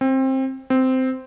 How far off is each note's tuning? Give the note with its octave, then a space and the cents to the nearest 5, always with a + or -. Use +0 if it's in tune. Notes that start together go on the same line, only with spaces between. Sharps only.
C4 +20
C4 -10